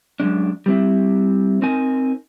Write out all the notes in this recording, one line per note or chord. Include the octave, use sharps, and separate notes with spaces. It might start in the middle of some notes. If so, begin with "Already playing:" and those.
F#2 C#3 G#3 D4
G3 C4 E4
C4 D#4 A#4 G#5